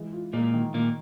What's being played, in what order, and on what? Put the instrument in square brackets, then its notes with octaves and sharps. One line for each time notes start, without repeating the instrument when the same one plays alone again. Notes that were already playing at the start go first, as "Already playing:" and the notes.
Already playing: [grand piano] E3 G#3
F4
[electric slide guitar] A#2 A#3 [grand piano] G#3
[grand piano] D#3
[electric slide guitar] A#2 A#3 [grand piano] D#3